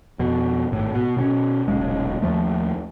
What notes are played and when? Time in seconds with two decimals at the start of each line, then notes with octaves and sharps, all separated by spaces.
0.19 F2 B2
0.72 G#1 A2
0.94 B2
1.17 B2 C4 C#4
1.68 D#1 B1 C#3 G#3
2.22 D#2 F3 A3